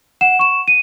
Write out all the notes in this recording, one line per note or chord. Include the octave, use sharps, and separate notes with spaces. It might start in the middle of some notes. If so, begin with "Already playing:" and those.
F#5 E7
C#6 E7
D#7